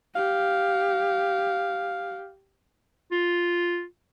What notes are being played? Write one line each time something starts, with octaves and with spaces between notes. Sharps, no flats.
G4 F5
F4